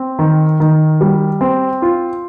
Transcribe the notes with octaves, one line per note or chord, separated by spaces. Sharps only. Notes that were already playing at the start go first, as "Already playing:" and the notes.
Already playing: C4
D#3
D#3
G3
C4
F4